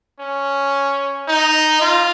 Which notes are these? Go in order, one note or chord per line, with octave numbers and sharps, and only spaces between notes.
C#4
D#4
F4